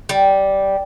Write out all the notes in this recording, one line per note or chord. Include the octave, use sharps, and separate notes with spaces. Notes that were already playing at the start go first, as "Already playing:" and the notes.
G3